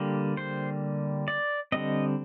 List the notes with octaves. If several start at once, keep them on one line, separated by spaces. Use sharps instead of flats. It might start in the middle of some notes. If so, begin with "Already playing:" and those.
Already playing: D3 G3 A#3
C5
D5
D3 G3 C4 D#5